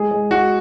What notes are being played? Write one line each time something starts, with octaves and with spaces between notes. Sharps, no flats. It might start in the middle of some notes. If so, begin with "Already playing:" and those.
Already playing: G#3 G#4
G#3
G#3 F#4